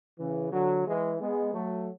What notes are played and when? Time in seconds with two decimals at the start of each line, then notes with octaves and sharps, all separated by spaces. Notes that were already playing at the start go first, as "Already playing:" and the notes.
0.19 C#3 E3
0.53 D3 F#3
0.86 E3 G#3
1.20 G#3 B3
1.54 F#3 A3